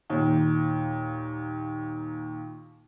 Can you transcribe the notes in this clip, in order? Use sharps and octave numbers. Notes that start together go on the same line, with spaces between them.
D#2 A#2